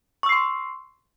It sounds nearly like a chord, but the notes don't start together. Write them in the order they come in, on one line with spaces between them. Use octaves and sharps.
C#6 E6 C7 C6